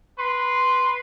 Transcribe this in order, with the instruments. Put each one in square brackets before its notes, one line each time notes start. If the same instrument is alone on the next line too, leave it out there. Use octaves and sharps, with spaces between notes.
[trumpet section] B4 C6